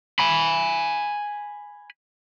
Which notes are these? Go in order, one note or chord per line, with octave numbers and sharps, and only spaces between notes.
G#5 B5